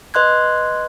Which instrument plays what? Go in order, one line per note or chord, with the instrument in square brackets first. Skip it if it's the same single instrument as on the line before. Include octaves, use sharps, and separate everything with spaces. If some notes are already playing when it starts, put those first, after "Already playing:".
[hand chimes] B4 D#5 C6 F#6 G#6